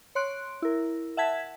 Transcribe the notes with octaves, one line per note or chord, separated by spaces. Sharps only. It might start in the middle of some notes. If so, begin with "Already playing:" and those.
C#5 C6 F#6 D7
E4 A#4
E5 F#5 A5 G#6 B6